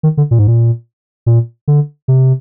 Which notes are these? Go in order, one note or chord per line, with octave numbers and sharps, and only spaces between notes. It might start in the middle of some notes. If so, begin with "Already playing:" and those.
D#3
D3
A#2
G#2
A#2
A#2
D3
C3